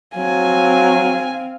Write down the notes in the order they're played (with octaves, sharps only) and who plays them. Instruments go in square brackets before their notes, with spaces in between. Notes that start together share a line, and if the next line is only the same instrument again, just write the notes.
[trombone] F#3 [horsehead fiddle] C4 F5 [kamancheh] G#5